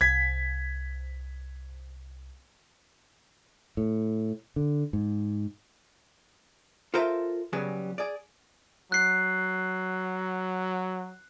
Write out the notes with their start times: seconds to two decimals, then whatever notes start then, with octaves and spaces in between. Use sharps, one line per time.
0.01 C2 G#6 B6
3.77 A2
4.56 D3
4.93 G#2
6.94 F4 A4 A#4 C5 E5 F5
7.53 C#3 F#3 G3 B3 G#4
7.98 G#4 D5
8.92 F#3 F#6 C7